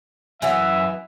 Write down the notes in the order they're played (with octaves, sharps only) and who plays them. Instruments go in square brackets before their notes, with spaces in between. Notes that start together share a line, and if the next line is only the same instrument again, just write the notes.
[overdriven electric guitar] F#2 F#5 [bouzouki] E3 F#3 B3 [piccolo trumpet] E5